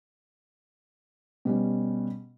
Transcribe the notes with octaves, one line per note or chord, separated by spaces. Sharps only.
B2 G3 C#4